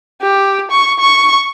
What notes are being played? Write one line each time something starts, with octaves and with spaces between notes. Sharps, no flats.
G4
C#6
C#6